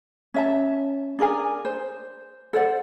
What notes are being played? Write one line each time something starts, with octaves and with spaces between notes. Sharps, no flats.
C#4 E5 A5
D4 G#4 A#4 G#5
C5
A4 C5 D5 F#5